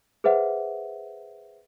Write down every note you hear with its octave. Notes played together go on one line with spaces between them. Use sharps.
G#4 B4 C5 E5 F#5